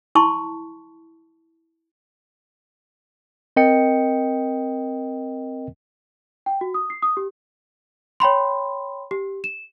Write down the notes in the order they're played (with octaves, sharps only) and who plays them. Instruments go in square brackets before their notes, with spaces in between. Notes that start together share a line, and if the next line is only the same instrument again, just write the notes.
[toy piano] E4 A5 C6 C#6
[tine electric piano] C4 A#4 D#5 G5 C#7
[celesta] G5
F#4
D#6
C7
D#6
G4
C#5 G5 B5 C6
G4
E7